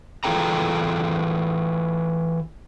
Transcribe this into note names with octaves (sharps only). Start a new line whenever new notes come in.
E3 F4 G#4 A4 G5 A#5